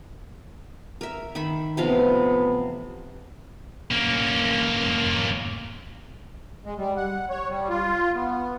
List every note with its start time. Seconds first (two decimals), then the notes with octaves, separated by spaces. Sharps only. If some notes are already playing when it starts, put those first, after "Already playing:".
1.01 A#4 E5
1.35 D#3 E5 B5
1.77 A1 C3 F3 B3 F5
3.91 A#3 C#4
6.65 G#3
6.78 G3
6.97 F#5
7.30 C#5
7.49 G3
7.70 F4
8.15 B3